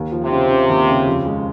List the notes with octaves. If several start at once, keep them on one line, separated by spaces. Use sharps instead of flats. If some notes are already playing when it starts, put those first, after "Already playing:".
Already playing: D#2
F3
C3
C#3
C#3
D#2
C#3
F2
G#3